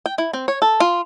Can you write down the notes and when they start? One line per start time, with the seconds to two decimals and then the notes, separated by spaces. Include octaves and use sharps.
0.06 G5
0.18 E4
0.33 C4
0.48 C#5
0.62 A4
0.80 F4